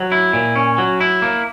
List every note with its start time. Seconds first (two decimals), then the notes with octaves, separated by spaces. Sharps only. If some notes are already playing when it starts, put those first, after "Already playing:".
Already playing: F#3
0.12 E4
0.33 A#2
0.56 C#4
0.78 F#3
1.00 E4
1.22 A#3